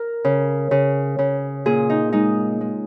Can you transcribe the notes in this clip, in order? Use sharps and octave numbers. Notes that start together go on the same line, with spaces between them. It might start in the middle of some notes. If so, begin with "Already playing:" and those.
Already playing: A#4
C#3
C#3
C#3
A#2 G#4
D#4
G#3 D#4
G#3